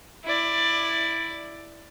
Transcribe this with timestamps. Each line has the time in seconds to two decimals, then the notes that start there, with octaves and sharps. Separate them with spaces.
0.24 E4 D5